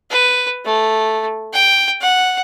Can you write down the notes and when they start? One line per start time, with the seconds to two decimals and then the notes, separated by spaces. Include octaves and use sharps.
0.10 B4
0.65 A3
1.53 G5
2.01 F#5